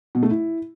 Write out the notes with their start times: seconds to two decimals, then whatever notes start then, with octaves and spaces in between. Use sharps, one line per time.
0.15 B2
0.23 A3
0.31 E4